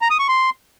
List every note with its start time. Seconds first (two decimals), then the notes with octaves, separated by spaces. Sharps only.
0.02 A#5
0.10 D#6
0.19 C#6
0.28 C6